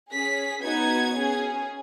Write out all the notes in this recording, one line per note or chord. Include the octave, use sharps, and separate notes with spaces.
C#4 G#4 B6
B3 D#4 F#4 G#6
C#4 G#4